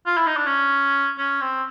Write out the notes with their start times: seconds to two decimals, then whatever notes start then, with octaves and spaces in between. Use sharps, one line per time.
0.06 F4
0.17 E4
0.27 D#4
0.37 D4
0.47 C#4
1.18 C#4
1.41 C4